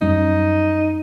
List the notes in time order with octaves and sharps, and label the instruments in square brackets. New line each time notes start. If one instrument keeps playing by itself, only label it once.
[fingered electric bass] F#2 G3 C#4 [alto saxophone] D#4